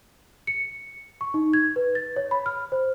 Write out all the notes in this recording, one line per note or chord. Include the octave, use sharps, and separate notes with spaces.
C#7
C#6
D#4
G#6
B4
A6
C#5
B5
F6
C5